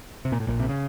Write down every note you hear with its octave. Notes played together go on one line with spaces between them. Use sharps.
C3
A#2
A2
A#1 A#2
C3
C#3